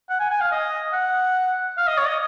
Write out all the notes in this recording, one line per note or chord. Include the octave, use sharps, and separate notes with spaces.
F#5
G#5
G#5
F5
D#5
F#5
F5
D#5
C#5
D#5